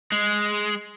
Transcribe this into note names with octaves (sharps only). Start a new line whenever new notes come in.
G#3